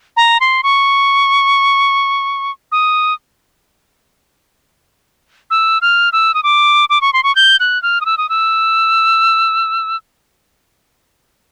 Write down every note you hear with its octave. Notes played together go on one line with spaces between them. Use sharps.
A#5
C6
C#6
D#6
E6
F6
E6
D#6
D6
D6
C#6
C6
C#6
G6
F#6
F6
D#6
E6
D#6
E6